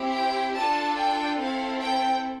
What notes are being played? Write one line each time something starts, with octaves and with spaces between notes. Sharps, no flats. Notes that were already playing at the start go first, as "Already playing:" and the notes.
Already playing: C4 E4 G4
G5
D4 F4 A4 A5
G5
C4 E4 A4 F5
G5